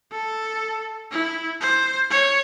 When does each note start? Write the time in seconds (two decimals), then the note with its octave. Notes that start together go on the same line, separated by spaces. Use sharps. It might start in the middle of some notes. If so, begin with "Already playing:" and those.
0.12 A4
1.11 E4
1.61 C5
2.11 C#5